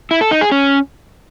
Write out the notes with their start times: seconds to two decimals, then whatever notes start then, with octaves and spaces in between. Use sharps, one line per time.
0.11 E4
0.21 A4
0.31 D#4
0.41 G#4
0.52 C#4